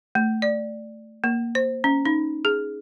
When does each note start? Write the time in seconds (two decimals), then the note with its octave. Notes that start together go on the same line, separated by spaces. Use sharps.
0.15 A3
0.42 D5
1.24 A#3
1.55 C5
1.84 C#4
2.06 D#4
2.45 G#4